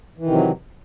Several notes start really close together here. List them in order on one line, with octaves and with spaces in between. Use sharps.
E3 D#3 C3 F#3